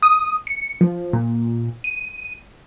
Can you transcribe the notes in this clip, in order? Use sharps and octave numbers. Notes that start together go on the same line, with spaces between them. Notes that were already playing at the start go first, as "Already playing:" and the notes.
D#6
C#7
F3
A#2
D#7